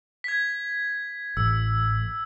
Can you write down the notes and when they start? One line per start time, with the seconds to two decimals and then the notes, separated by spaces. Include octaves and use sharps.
0.24 G#6 B6
1.37 A1 E6